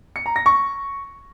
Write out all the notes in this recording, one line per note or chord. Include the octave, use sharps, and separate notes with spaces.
C#7
A#5
A#6
C#6